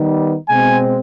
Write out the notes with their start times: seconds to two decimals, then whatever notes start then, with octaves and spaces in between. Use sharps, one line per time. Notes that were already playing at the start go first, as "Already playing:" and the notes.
Already playing: D#3 G3 B3 D#4
0.49 B2 G#3 C4 G#5